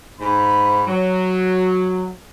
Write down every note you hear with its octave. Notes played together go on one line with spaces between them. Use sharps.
G#2 B5
F#3